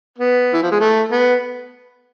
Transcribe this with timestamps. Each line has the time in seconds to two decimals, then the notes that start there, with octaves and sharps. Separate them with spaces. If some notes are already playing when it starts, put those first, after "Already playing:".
0.18 B3
0.53 E3
0.63 F3
0.71 G#3
0.81 A3
1.12 B3